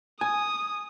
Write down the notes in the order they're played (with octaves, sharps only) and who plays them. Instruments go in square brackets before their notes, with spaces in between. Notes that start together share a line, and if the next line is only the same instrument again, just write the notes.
[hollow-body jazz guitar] G#5 [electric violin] D#6